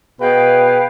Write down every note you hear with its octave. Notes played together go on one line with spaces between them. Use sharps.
B2 G#4 B4 F5 G5